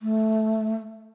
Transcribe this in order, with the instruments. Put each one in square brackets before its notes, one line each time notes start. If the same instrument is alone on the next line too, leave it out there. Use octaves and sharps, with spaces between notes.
[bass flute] A3